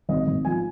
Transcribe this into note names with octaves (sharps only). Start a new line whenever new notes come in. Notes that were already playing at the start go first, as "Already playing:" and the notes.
G#1 D#5
G#1
F3 G#5